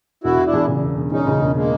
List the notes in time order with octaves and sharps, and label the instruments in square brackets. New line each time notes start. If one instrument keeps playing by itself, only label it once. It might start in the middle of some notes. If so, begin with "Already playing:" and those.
[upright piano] E1 [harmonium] E4 F#4
[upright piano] E1
[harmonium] D4 E4
[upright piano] E2
C#3
E1
E1
[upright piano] E2 [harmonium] C#4 D#4
[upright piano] C#3
E1
[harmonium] G#3 A#3